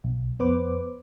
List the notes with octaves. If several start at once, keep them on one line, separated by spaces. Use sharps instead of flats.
B1
F2 B3 B4 C5 D6